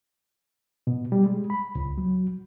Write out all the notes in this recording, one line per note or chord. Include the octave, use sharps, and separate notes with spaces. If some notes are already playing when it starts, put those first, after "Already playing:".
B2
G3
G#3
B5
C#2
F#3